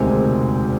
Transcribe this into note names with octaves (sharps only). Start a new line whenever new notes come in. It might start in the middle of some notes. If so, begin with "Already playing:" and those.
Already playing: E1 D2 C3 D#3 G#3 G#5